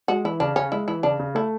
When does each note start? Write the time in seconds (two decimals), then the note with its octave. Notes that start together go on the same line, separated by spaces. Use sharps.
0.08 G#3 F#4
0.25 E3 E4
0.40 C#3 D4
0.56 C#3 C#4
0.72 G#3 E4
0.88 E3 E4
1.03 C#3 D4
1.19 C#3
1.35 A3 E4